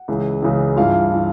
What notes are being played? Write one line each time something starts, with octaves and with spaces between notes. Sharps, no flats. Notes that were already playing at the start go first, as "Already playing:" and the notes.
Already playing: F#5
C#2 C#3 E3
C#2 C#3 E3
G2 E3 F4 F5
E3